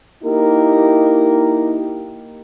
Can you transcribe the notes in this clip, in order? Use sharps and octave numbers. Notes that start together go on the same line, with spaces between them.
A#3 D#4 E4 G4 A#4